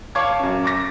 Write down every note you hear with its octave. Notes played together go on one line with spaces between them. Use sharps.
C#5 F5 A5 C#6 D6 G#6
F#2 C#4
D6 A6 A#6